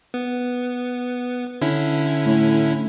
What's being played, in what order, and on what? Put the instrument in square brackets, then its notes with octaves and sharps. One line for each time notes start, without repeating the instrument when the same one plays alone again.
[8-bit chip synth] B3
D3 C#4 E4
[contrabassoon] A2